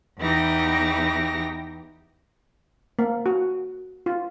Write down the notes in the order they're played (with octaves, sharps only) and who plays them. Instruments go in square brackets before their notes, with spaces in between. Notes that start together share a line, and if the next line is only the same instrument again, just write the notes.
[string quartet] E2 E3 D#4 G4 A#6
[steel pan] A#3
F#4
F4